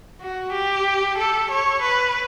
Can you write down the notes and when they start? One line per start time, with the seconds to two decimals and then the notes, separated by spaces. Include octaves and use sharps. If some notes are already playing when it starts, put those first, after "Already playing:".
0.21 F#4
0.53 G4
1.18 A4
1.50 C#5
1.82 B4